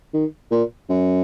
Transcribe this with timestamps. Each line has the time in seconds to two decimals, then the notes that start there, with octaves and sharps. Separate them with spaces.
0.14 D#3
0.51 A#2
0.89 F#2